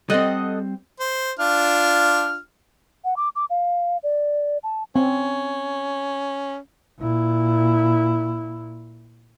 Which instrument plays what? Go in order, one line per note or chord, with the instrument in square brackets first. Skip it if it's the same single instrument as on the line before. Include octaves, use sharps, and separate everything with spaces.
[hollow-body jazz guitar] G3 C4 [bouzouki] A4 D#5 F#5
[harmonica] C5
D4 F4 F6
[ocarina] F#5
D6
D6
F5
D5
A5
[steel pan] C4 [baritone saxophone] C#4
[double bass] A#2 E4